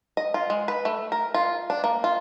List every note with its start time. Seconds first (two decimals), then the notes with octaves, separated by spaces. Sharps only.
0.17 D#5
0.34 F4
0.50 G#3
0.68 B4
0.85 A3
1.12 A#4
1.34 F4
1.70 D4
1.84 A#3
2.04 F4